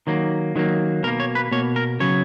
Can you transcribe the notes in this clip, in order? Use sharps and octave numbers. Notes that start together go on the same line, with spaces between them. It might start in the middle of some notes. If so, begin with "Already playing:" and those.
D#3 F#3 A#3
D#3 F#3 A#3
B2 A#3 A#4
C#5
B4
B2 A#3 C#5
A#4
C#3 F#3 B3 C#5